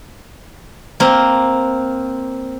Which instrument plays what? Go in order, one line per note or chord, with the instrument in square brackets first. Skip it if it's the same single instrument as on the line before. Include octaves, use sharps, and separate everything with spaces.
[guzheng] A#3 C4